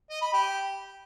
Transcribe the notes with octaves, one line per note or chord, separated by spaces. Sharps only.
D#5
B5
G4